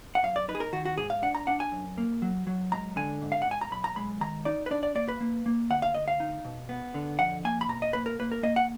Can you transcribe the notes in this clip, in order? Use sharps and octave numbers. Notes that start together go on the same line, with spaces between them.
F#5
F#2 F5
D5
D#4 B4
G#4
A#4
D#3 F#4
F#4
G#2 G#4
F5
D4 F#5
A#5
D4 F#5
G#5
F#2
A#3
F#3
F#3
G#3 A#5
D3 G#5
G#2
F5
F#5
G#2
G#5
A#5
B1 B5
A#5
G#3 B5
D#3 A#5
D#4 D5
B4
D4 D5
D5
A#3 D5
B4
A#3
A#3
D2 F#5
F5
D2 D#5
F5
D#4
B2
B3
D3
F2 F#5
A#3 G#5
B5
B2 A#5
D#5
A#3 B4
A#4
A#3 B4
A#4
A#3 D#5
F#5